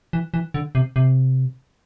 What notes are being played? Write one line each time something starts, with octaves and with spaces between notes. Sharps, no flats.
E3
E3
D3
C3
C3